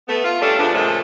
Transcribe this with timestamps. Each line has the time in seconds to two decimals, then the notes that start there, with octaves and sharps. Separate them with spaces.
0.08 A3 B3
0.25 F4
0.41 G3 A3 C#4 D4 A4
0.59 C#3 F3 A3 B3 D4
0.74 A#2 C#3 F3 G#3 A3 C#5